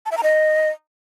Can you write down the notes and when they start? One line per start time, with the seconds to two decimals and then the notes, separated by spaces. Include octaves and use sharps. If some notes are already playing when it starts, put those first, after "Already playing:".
0.06 A5
0.12 E5
0.17 A#5
0.23 D#5